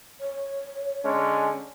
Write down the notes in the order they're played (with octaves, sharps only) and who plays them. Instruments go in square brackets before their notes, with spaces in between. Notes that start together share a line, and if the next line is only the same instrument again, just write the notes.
[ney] C#5
[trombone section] D3 G#3 C#4